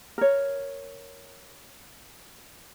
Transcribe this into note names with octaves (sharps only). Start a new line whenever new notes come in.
A#4 C#5